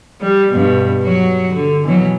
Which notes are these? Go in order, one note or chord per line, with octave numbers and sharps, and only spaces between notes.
G3
G2 B2
F#3 F#4
D3
B2 E3 F#3